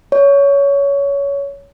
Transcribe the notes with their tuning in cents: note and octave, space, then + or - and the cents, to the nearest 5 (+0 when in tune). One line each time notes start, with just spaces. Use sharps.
C#5 +20